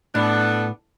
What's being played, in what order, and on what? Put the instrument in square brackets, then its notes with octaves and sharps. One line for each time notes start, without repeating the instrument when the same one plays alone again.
[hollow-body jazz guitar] A2 [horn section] B3 D4 A4